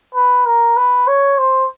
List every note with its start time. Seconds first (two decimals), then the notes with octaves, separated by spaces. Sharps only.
0.15 B4
0.46 A#4
0.77 B4
1.08 C#5
1.38 C5